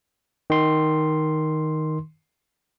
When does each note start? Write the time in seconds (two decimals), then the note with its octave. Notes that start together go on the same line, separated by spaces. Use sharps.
0.50 D#3 C6